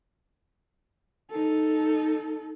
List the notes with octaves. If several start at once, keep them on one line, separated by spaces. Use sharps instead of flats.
D#4 A4